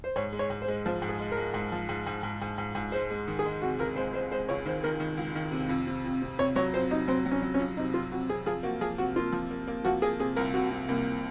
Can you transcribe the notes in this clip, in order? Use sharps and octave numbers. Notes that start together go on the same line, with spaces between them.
C5
G#2 C#5
G#3
C#5
G#2
C5
G#3
F3 C5
G#2
G#4
G#3
A#4
G#3
G#2
F3
G#2
G#2
G#2
G#2
G#2
G#2
G#3 C5
G#3
D#3
G#4
G#3
C3 F#4
C#2 A#4
G#3 C5
G#3 C5
G#3 C5
C#2 C#5
D#3 C5
D#3 A#4
D#3
C#2
D#3
C3
F2
C3
F2
C3
C3 C#5
F#3 C#5
F2 C5
C3 D#4
F#3 C4
F#3
C#4
F#3
C#4
F2
C3 D#4
F2 F4
F2 F#4
C3 G#4
F3 G#4
A#3 F#4
F3 G#4
C3 F#4
A#3 F4
F3
A#3
A#3
F3 F#4
A#3 G#4
C3 G#4
C2 A#4
C3 F#4
C3
C2 A#3